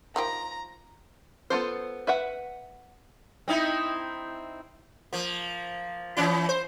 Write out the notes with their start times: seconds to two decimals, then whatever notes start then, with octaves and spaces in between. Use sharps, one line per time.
0.16 D#3 F3 G4 A#5
1.50 B3 F4 A4 C5
2.07 B4 E5 F#5
3.48 C4 D#4 E4
5.13 F3 A#3
6.17 E3 C#4 E4
6.49 C5